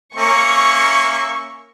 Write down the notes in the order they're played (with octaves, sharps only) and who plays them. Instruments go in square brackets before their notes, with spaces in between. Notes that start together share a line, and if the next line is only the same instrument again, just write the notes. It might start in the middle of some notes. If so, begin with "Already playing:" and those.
[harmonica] A#3 C#4 E5 [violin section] C#6